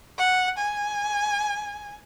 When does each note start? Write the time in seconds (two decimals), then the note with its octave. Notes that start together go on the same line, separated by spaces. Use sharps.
0.18 F#5
0.58 G#5